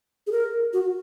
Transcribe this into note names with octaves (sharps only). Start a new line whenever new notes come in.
G#4
A#4
F#4